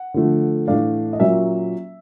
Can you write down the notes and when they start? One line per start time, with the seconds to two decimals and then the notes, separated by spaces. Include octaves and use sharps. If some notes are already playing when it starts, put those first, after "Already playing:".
Already playing: F#5
0.14 D3 F3 A3
0.68 A2 E3 A3 D4 F5
1.13 D#5
1.20 A#2 F#3 A#3 C#4 E5